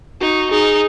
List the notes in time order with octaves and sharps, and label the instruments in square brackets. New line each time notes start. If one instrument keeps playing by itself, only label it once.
[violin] D#4 [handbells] F#4
[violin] D#4 [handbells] G#4